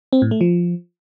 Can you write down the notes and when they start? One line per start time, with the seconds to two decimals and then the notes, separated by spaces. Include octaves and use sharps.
0.13 C4
0.22 A2
0.31 A3
0.41 F3